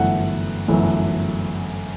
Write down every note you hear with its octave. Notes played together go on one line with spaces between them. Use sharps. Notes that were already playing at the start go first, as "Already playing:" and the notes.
Already playing: G1 F#2 E3 A3 F#5
G1 F#2 E3 A3